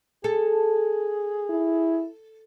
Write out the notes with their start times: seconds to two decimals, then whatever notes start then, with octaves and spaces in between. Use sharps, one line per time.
0.24 G#4 A4
1.50 E4